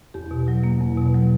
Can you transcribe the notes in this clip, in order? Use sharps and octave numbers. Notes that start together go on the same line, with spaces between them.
E2 G4
B2
F#3
A#3
E2
B2
F#3